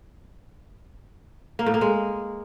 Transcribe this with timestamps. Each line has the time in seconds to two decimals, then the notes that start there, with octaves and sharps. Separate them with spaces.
1.59 A#3
1.66 A2
1.74 A#3
1.81 G#3